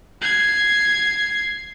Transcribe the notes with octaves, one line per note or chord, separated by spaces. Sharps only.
G#6 C7